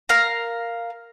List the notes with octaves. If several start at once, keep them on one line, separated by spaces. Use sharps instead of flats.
A#4 F5 A#5